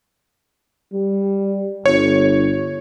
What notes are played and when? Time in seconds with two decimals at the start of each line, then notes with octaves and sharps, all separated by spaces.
0.93 G3
1.86 G1 C#5